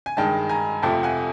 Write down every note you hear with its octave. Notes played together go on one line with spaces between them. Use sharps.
G#5
G2 D#3 G#3 G5 A5
G#5 A#5
F2 C3 F3 A3 G5 A5
F#5 G#5